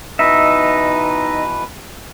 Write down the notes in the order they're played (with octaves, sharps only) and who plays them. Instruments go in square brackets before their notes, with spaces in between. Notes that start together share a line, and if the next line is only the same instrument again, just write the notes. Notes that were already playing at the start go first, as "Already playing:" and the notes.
[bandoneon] B2 E3 B4 [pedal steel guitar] D#4 E5